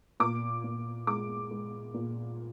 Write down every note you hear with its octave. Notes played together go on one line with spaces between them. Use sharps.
A#2 D6
A#2
G#3 D6
G#3
A#2